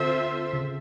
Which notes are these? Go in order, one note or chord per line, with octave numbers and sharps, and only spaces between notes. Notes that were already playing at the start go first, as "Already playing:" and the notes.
Already playing: D3 C4 F4 A4 C5 E5
C#3